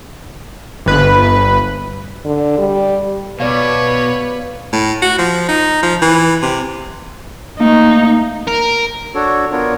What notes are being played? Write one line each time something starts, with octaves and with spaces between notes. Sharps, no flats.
G1 B4
D3
G3
B2 B3 B4 C#5 D5 F5
A2
F#4
F3
D#4
F3
E3
C3
A3 A#3 D#4
A#4
D4 F#4 A4 C#5
B3 D4 F4 A#4 C#5